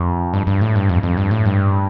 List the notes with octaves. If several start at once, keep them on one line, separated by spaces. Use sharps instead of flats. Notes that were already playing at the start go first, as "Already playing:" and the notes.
Already playing: F2
G2
G2
A2
G2
F2
F2
G2
A2
G2